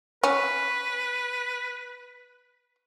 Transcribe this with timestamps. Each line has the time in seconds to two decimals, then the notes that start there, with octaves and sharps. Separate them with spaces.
0.24 C#4 B4